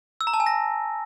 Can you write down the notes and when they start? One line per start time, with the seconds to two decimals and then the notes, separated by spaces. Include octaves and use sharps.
0.21 E6
0.27 A#5
0.34 A5
0.40 G#5
0.46 A#6